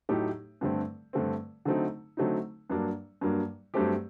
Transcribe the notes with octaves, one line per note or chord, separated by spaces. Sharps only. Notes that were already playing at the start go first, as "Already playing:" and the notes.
A2 F#3 A3 D#4 G4
G2 D3 A3 C4
G2 D3 A3 C4
D3 F#3 A3 C4 D#4
D3 F#3 A3 C4 D#4
G2 F#3 A#3 D4
G2 F#3 A#3 D4
G2 F#3 A3 C4 G4